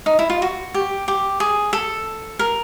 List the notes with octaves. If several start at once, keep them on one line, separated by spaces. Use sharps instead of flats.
D#4
E4
F4
F#4
G4
G4
G#4
A4
A#4